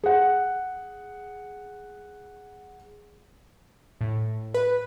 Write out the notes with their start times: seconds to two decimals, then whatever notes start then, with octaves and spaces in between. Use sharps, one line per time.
0.03 G#4 F#5
4.01 A2
4.54 B4